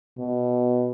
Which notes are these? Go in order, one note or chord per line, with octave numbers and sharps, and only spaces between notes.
B2